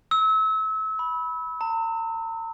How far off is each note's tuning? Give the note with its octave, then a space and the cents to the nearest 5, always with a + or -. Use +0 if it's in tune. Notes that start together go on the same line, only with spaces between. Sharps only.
E6 -30
B5 -10
A#5 -45